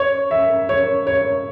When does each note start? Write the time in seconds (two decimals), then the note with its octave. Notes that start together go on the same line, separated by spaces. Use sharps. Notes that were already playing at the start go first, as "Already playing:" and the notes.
Already playing: C#5
0.31 E5
0.69 C#5
1.07 C#5